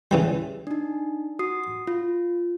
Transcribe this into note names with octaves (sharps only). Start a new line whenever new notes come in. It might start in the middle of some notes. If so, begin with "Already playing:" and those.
C#3 E3 G3
D4 D#4
F#4 D#6 C7
F4